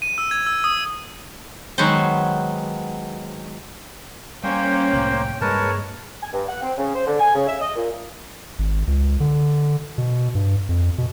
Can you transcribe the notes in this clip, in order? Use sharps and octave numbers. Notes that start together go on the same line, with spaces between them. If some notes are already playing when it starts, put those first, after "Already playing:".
D#7
E6
G#6
E6
D#6
D#3 F#3 G#3 B3 C5
G3 A#3 C#4 C5 G5
C2 A2
G2 G3 G#3 A#3 A#4 B4 C#5 A5
G#5
G2
F#5
C4
C#3
C5
D3
G#5
C#3
E5
D#5
A#2
G#1
C#2
D3
B2
G2
F2
B2